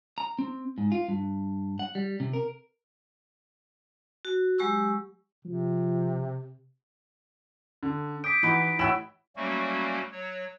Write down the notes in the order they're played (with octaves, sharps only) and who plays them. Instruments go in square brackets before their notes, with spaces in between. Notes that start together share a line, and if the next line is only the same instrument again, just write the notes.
[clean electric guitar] A#5
C4
G#2
F4
G2
F#5
G3
C3
A#4
[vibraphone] F#4
F#3 G#3 G4 C#6 E6
[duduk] C3 [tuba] F3
[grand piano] D3
[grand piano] D6 D#6 G6 [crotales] B6 D7
[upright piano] E3 [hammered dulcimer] D#4 F#4 B4
[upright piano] A1 [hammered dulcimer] E4 F#4 E5 [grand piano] G5 E7 F#7
[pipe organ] F#3 G3 A3 A#3 C#4 F#4
F#3 C#5